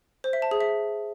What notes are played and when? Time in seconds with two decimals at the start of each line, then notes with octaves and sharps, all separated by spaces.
0.24 C5
0.33 E5
0.42 A5
0.51 G#4
0.61 E5